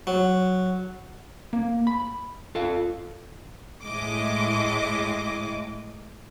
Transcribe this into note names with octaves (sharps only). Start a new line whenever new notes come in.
F#3
A#3
B5
F4 A4 F5
A2 G#3 D#5 D6